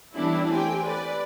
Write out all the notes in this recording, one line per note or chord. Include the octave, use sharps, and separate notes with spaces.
E3 G3 B3 C#4 D4 E4
A3 C4 G4 G5 G#5
B4 D5